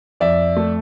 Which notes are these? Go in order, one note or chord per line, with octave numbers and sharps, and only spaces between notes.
F2 D5 E5
A3